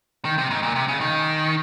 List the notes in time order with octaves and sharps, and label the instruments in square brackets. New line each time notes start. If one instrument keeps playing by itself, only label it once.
[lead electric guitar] D#3
C3
G#2
A#2
C3
C#3
D#3